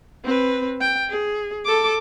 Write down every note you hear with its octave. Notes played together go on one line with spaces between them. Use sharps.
C4 B4
G5
G#4
A4 D6